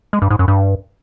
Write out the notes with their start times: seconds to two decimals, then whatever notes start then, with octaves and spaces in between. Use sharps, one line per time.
0.13 G#3
0.22 G2
0.30 G#2
0.39 F#2
0.48 G2